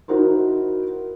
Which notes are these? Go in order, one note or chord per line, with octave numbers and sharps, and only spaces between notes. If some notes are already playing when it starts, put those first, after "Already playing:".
D#4 E4 F#4 A#4 C5